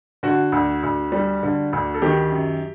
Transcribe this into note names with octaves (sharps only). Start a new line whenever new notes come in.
D3 F#4
D2
D2
G3
D3
D2
A4
D#3 G4
F#2